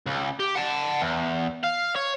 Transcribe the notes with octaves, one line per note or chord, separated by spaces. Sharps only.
C#2
G4
F#5 A5
E2
F5
C#5